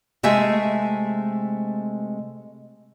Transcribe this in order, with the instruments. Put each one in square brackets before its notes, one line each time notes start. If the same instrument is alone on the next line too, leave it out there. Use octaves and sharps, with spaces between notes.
[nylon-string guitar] C3 G#3 A3 E5 G#5